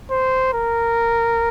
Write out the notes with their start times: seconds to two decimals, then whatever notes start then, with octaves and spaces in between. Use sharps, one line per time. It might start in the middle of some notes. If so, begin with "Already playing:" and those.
0.11 C5
0.53 A#4